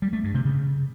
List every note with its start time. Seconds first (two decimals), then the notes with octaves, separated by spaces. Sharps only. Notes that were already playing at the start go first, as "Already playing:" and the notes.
0.02 G3
0.13 A3
0.24 G2
0.34 C3
0.45 C#3